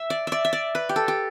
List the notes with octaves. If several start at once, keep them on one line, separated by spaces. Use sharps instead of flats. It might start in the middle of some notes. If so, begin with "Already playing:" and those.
Already playing: E5
D5
D5 E5
E5
D5
B4
G4
A4
G4